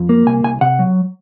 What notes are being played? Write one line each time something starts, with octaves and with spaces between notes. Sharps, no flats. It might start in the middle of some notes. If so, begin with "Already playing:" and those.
Already playing: F2
A#3
C2 G#5
C2 G#5
C3 F#5
F#3